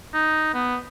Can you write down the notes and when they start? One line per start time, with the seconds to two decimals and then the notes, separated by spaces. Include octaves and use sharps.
0.14 D#4
0.54 B3